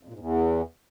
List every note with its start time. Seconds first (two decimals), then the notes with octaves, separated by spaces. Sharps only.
0.03 F2
0.08 A#2
0.14 G#2
0.19 E2